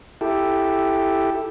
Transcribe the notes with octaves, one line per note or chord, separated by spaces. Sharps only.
E4 G4 A4